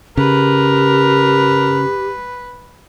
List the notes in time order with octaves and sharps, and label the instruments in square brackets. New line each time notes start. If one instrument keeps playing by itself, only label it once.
[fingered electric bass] C#3 [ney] G4 [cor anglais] A#4 [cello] B4